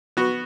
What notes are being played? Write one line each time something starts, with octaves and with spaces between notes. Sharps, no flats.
B3 F#4